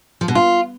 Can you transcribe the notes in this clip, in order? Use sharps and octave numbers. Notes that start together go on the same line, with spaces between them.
F3
B2
F4